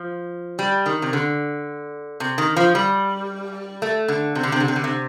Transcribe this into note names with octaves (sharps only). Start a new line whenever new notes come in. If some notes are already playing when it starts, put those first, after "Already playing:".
Already playing: F3
G3
D#3
C3
D3
C3
D#3
F3
G3
A3
D3
C3
D3
C3
D3
C3
D3
C3